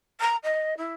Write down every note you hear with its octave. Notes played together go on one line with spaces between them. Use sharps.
A#5
D#5
E4